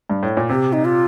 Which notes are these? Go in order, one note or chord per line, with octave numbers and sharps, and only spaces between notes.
G2
A2
A#2
C3 G4
D#4
F4